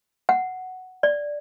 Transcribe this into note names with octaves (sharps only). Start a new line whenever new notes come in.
F#5
D5